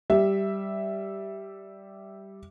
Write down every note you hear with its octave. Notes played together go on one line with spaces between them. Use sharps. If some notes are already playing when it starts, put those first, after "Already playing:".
G3 E5